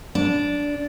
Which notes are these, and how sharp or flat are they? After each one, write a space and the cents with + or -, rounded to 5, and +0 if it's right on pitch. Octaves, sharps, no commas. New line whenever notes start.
D4 -10